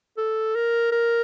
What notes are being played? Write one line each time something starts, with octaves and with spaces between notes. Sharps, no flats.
A4
A#4
A#4